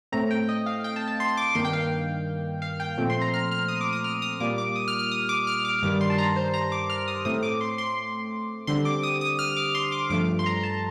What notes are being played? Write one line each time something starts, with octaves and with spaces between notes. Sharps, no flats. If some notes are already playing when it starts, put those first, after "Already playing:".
A2 A3 C4 A#5
G5
D#5
F5
G5
A5
A5
C6
D6
G2 D#3 A#3 C6
G5
F5
F5
G5
A#2 F3 A3 C4
C6
A#5
F6
F6
D#6
D6
D#6
F6
D#6
A#2 G3 A#3 D6
D6
D#6
F6
F6
D#6
D6
F6
D6
G2 D#3 G3 D6
C6
A5
A#5
C5
A#5
D6
F6
D#6
A2 A3 C4 D#6
D6
C6
C6
D3 G3 C4 C6
D6
D#6
D#6
F6
D6
C6
D6
G2 F3 A3 D6
C6
A#5
A5